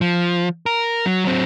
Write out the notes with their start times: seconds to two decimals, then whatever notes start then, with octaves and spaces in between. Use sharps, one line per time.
0.01 F3
0.66 A#4
1.06 F#3
1.25 F#3 C4